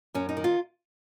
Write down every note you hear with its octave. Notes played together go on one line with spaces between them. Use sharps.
F#2 C#4
D#4
D#3
F4